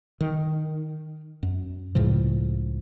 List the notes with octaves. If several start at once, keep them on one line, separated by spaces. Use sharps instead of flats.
D#3
F#2
C#2 A2 C#3 F3